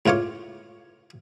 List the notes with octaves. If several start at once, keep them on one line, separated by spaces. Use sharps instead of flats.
C#2 A2 F4 C#5 D6